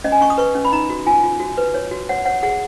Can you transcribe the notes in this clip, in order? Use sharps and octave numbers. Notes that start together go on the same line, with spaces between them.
C#4 D#5
G#5
C#4 C#6
D#6
B4 C#6
C#4
B5
D#4 A#5
F#4
F4 G#5
F4
F#4
B4
C#5
F#4
C#5 F#5
C#5 F#5
G#4 F#5